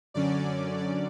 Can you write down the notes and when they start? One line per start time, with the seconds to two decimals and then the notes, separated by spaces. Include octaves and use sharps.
0.14 F#2 D3 F#3 C#4 D5
0.78 D5